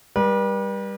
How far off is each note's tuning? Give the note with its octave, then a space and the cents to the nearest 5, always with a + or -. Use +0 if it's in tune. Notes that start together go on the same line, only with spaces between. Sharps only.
G3 +15 B4 -40